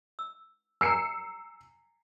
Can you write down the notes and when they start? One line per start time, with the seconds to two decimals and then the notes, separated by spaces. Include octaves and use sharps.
0.19 E6
0.81 G#5 A#5 E6 C7 C#7